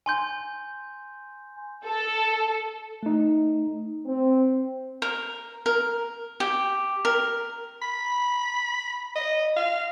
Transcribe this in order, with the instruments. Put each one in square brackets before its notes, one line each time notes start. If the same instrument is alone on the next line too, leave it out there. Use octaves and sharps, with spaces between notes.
[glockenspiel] G#5 C6 G6
[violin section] A4
[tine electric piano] A3 D#4
[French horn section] C4
[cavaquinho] A#4
A#4
G4
A#4
[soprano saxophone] B5
D#5
F5